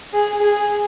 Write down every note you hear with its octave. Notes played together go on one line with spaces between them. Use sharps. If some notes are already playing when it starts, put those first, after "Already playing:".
G#4
G#4